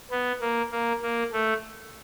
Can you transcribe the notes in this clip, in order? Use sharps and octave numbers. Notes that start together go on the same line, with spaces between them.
B3
A#3
A#3
A#3
A3